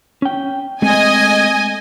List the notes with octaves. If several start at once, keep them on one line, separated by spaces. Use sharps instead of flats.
C#4 G5
G#3 A3 C4 D#5 G#5